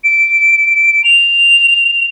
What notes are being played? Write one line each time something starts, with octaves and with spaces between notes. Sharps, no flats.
D7
F7